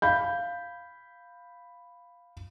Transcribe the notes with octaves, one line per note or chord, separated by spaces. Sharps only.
F5 B5 G6